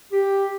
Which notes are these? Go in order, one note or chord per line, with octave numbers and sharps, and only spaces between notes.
G4